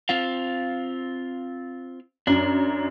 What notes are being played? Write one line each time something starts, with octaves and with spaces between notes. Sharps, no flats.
C4 F4 F5
F#2 D4